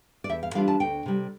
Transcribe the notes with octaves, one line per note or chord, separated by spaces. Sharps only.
D5
E2 E5
F5
E3 G3 D4 F4 F5
A5
D2 G5
C3 G3